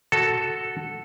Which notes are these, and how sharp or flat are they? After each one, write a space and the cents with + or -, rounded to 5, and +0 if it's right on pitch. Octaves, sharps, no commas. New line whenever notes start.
F#4 +0 A4 +0